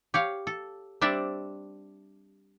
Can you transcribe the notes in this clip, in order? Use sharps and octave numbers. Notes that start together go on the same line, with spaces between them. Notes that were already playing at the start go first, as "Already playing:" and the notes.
G4 C#5 F5
A4
G3 C4 D4 D5 E5